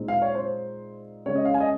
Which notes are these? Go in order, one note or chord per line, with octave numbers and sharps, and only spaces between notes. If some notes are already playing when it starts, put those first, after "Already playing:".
Already playing: A#2 G#3 C4 D#4
F5
C#5
C5
C#3 G#3 C#4 C#5
D#5
F5
G#5
D#5